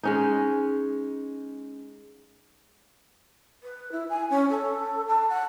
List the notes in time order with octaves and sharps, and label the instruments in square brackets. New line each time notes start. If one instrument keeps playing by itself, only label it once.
[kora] G#3 C#4 D#4
[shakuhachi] B4
E4
G#5
C#4
A4
A5
F#5